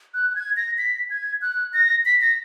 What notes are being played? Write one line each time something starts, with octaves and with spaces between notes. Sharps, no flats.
F#6
F#6
G#6
A#6
B6
G#6
F#6
A#6
B6
A#6